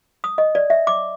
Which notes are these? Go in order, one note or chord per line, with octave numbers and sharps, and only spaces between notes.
D#6
D#5
D5
E5
D6